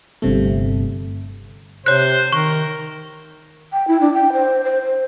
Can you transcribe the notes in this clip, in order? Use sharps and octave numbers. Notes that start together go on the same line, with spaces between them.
G1 C3 A3
C3 C5 C#5 F#6
D#3 A#4 C#6
G5
E4
D4
G5
C5
C5
C5